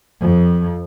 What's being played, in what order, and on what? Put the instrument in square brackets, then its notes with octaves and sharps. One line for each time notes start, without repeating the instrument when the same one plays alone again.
[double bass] F2 F3